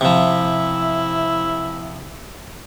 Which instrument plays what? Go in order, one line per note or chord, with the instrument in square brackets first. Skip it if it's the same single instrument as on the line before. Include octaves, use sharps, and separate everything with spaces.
[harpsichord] C3 F3 [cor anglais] E4